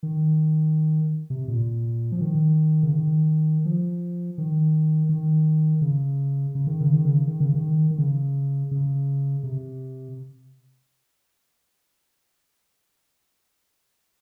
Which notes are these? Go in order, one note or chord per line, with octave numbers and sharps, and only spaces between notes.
D#3
C3
A#2
F3
D#3
C#3
D#3
F3
D#3
D#3
C#3
C#3
D#3
C#3
D#3
C#3
D#3
C#3
D#3
D#3
C#3
C#3
C3